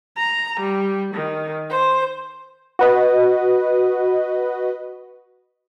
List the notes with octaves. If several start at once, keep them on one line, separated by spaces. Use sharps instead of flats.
A#5
G3
D#3
C5
F#4 B4 D#5